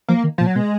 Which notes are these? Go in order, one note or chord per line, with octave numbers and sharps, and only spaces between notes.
F3 A#3
D#3
A#2 F3
F#3
B2 G#3